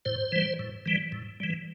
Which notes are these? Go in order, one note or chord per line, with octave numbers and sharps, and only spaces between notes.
A2 C5
E3 G3
A2
E3 G3
A2
E3 G3